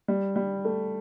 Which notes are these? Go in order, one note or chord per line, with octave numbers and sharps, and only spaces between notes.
G3
G3
A3